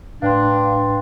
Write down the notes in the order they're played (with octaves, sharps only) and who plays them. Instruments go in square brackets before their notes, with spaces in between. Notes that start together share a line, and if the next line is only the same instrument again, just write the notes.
[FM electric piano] A2 F5 [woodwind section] D4 [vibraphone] B4 G5 C6